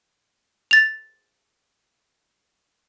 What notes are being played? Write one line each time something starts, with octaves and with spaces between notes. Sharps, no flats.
A6 F7